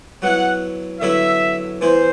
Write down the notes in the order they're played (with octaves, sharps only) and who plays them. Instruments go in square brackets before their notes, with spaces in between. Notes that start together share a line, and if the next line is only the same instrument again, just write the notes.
[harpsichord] F#3 B3 E4 [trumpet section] F#5
[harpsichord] D3 F#3 B3 E4 [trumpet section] E5
[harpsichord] E3 B3 E4 [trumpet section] C5